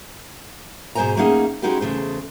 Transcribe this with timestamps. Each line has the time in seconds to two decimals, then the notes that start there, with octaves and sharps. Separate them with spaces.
0.95 G#2 B2 D#3 C5 G#5 A#5
1.17 A3 A#3 C#4 D#4 G#4 F#5
1.62 G#3 C#4 D#4 E4 F#4 G4
1.81 E2 C#3 A3 C5